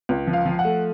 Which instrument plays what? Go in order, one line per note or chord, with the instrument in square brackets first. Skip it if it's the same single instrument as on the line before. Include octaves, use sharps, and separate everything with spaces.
[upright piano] C#2
F3
F5
F3
F#5
A3